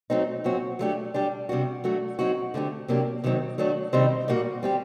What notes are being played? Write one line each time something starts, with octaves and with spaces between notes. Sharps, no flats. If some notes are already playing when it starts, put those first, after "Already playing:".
F#3 A3 C4 D#4
A#2 F#3 C4 F#4
F#3 A3 D4 G4
G3 D4 G4
C3 G3 D4 F#4
F#3 A3 D4 F#4
F#3 C4 D#4 F#4
D3 A3 C4 G4
C3 F#3 A#3 D4 G4
C3 D#3 F#3 C4 D#4
D#3 F#3 A3 D4 F#4
C3 D#3 G3 C4 D#4
A#2 G3 A#3 F#4
G3 C4 G4